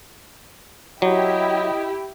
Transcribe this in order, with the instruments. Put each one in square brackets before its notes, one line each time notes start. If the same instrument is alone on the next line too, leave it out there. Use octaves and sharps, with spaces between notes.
[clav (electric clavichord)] F#3 [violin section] E4 G4 [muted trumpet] D#5